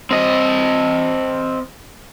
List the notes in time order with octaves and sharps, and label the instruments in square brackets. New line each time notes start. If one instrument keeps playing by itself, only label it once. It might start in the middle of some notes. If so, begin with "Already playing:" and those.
[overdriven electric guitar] C4 D#5